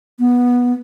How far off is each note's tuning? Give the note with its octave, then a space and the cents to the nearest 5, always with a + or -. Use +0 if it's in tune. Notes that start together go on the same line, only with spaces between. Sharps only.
B3 -15